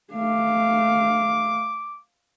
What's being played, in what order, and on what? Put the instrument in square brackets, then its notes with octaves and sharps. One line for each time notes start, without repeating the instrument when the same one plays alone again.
[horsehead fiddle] A3 F5 [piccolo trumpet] D6